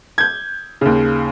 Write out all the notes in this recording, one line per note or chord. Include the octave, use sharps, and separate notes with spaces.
G6 G#6
D#2 C#3